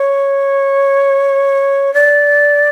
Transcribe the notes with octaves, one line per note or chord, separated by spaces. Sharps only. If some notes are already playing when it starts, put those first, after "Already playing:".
Already playing: C#5
D5